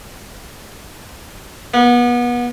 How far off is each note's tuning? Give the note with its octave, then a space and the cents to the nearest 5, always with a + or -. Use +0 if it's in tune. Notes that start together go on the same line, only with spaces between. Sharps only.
B3 -30